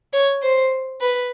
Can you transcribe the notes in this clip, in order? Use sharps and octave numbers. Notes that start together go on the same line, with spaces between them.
C#5
C5
B4